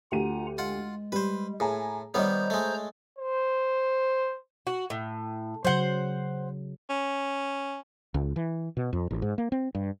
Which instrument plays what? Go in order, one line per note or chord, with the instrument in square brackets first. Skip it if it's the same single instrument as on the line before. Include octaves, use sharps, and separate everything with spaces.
[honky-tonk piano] D2 G4 D#7 [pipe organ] F4 F#5 A#5
[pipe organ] G#3 [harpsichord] F4 F#5
[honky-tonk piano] G3 [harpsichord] B4 C5
[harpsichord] A2 [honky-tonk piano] G#4 G#5 A#5
[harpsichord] D#3 G3 B3 [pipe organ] C5 A#5 G6 [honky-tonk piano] C#5 D#5
[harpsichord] G#3 A3
[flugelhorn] C5
[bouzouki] F#4
A2
[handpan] C#3 F#3 [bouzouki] C5 F#5
[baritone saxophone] C#4
[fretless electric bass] C#2
E3
B2
F2
A1
G#2
A#3
C4
G2